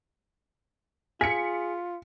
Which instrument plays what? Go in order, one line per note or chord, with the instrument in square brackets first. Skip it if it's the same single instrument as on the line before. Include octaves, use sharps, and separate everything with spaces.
[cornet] F4 [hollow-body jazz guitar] G#4 [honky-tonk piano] B6 C#7